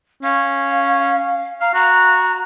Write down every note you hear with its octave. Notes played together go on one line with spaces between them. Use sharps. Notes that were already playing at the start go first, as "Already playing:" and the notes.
C#4 F5
F5 A#5
F#4 A#5